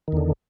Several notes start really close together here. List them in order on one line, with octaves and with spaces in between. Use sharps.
D#3 E2 D3